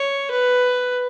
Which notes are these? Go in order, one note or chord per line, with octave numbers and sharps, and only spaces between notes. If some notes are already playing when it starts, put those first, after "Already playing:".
Already playing: C#5
B4